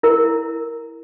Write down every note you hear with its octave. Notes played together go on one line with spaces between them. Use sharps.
E4 A#4